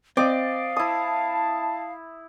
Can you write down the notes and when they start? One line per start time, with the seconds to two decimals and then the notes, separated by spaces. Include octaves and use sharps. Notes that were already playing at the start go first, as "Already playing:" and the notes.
0.17 C4 D5 D#5 F5
0.76 E4 A5 D#6